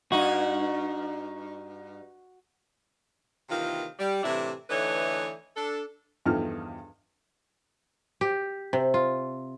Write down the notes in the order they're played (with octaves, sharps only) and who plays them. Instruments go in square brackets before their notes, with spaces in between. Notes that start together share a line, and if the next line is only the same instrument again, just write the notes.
[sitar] G2 D#4 [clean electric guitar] F#4
[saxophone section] C3 D#3 E3 A#3 F4
G3
A2 C3 E3 D4 E4
D3 E3 A3 D#4 B4 C#5
D4 A4
[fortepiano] E2 G2 D3 F3 D#4 F6
[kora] G4
C3
F4